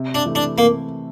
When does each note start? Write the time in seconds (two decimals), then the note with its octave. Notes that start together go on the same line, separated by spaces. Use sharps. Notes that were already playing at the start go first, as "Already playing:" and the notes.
Already playing: C3
0.14 D4
0.26 E3 A3 E4 A4
0.35 D4
0.57 C3 A#3